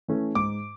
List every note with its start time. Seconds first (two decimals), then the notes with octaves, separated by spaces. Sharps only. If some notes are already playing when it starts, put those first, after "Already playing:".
0.08 E3 A3 C#4
0.35 G#2 D6